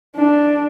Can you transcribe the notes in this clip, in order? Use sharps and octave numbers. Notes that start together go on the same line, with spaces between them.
D4